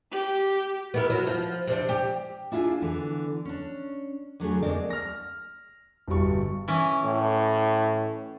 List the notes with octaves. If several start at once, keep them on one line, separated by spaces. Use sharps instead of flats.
G4
B3 E4 A#4
F#3
F3
C3 C4 D4
G4
D4 E4 F4 G4 G#4
D3 E3 B3
C#4 D4
D3 F#3 A3 G#4
G#3 A#3 C4 D4 G#4 D5
F6 A#6
G1 G2 B2 G3 C#6
E3 C#4
A2